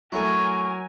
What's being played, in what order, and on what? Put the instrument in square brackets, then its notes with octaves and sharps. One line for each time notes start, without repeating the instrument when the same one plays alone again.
[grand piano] F#3 [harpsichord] A3 C#4 E4 [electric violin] A#4 G#5 [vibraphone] C#6